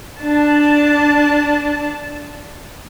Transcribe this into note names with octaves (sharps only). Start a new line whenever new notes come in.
D4 A5